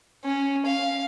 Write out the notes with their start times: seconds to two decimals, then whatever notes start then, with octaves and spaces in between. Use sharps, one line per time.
0.24 C#4
0.66 F5